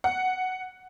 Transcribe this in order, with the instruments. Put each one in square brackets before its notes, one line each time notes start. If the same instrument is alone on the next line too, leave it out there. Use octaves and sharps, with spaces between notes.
[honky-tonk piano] F#5